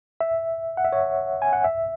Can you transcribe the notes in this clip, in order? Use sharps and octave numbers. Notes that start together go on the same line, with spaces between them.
E5
F#5
E5
C#5
G#5
F#5
E5